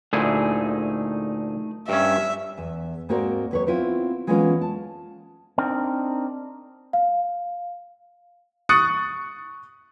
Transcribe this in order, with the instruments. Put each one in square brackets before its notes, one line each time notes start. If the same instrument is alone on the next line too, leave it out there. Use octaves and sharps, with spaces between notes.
[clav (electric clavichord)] D2 A#2 E4 [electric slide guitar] A3 D#4 G#4
[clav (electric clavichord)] G2 C#4 [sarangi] E5
[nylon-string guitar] E2
G#2 A#3 C4 F#4 A#4 D5
D#2 B4 C#5
B3 C4 E4 F4
E3 G#3 A#3 B3 C#4 F4
A5
[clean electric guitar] C4 D4 D#4 A#4
[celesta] F5
[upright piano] C#6 D#6 F#6 A6 C#7